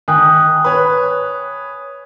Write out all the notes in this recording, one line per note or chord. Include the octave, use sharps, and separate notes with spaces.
D#3 G#5 D#6 F#6
B4 C#5